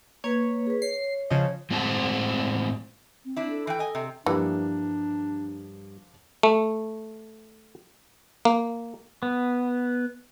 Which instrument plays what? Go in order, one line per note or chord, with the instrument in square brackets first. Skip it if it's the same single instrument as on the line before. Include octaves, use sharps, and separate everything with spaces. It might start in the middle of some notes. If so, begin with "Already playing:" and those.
[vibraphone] A#3 B4 [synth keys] C#5
[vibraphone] G#4 B4
[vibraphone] C#5 [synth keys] C7
[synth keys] C#3 F3 D#5
[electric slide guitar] A2 G#3 C4 F#4 C5 A5
[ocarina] C4
[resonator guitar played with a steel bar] D4 E4
[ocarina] A4
[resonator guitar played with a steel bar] E3 G5
D#5 G#5
C3
[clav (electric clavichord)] G2 G3 [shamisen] E3 [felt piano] F3 A#3 [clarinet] D4
[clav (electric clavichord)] A3
A#3
[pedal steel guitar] B3